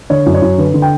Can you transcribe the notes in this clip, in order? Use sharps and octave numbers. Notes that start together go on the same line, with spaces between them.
D3 C#5
F#2
C#5
F#2
D3 B4
D3
G5